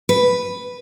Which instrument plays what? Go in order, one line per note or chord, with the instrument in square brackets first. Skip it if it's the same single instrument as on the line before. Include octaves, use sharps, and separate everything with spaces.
[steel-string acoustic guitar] B4